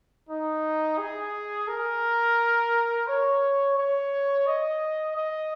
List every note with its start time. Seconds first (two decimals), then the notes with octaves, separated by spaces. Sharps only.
0.29 D#4
0.98 G#4
1.68 A#4
3.07 C#5
3.77 C#5
4.47 D#5
5.16 D#5